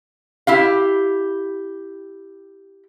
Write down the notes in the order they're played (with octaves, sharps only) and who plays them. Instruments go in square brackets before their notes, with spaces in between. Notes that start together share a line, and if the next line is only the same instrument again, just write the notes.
[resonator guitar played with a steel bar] E4 G4 F5